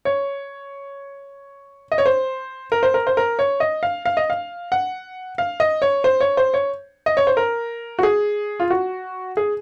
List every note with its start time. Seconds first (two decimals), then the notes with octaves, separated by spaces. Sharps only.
0.05 C#5
1.92 D#5
1.98 C#5
2.06 C5
2.72 A#4
2.83 C5
2.94 A#4
3.07 C5
3.17 A#4
3.39 C#5
3.60 D#5
3.83 F5
4.06 F5
4.17 D#5
4.30 F5
4.72 F#5
5.38 F5
5.60 D#5
5.82 C#5
6.04 C5
6.21 C#5
6.37 C5
6.54 C#5
7.06 D#5
7.17 C#5
7.27 C5
7.37 A#4
7.99 F#4
8.03 G#4
8.60 F4
8.70 F#4
9.37 G#4